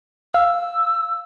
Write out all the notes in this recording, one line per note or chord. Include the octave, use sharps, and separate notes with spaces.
F5 E6